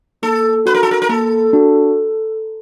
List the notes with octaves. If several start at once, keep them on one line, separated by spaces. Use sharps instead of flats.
A#3 A4
D4 F#4 B4
A#4
A4
A#4
A#4
A#3 A4
D4 F#4